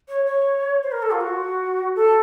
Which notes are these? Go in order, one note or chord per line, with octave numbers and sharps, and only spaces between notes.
C#5
C#5
C5
A#4
A4
F4
F#4
A4